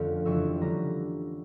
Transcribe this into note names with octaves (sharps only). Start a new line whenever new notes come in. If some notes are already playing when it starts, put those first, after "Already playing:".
Already playing: F2 D3 A3 C#4 F5
F2 C#3 E3 G3 C#6 E6
D3 G3 C#4 A#5